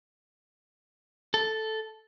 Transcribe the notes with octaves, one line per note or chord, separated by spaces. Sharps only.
A4